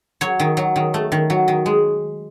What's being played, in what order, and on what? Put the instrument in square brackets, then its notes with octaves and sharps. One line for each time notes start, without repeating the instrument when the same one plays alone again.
[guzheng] F#3 C#5
D#3
F#3
D#3
A3
D#3
F#3
D#3
G#3